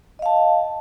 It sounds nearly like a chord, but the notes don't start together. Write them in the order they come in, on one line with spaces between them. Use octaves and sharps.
D#5 F5 A5